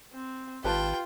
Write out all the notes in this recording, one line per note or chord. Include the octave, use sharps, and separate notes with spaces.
C4
G#1 F4 G4 B4 G5 A5